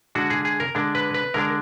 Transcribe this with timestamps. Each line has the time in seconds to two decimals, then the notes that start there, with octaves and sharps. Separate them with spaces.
0.15 D3 G#3 D4 F#4
0.30 G#4
0.45 G#4
0.60 A#4
0.75 D3 G#3 D4
0.95 B4
1.14 B4
1.34 D3 G#3 D4 A#4